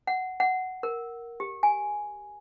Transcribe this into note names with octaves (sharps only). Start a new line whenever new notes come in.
F#5
F#5
A#4
G4
G#5